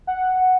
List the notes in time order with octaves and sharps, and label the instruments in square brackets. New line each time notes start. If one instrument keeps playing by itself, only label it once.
[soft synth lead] F#5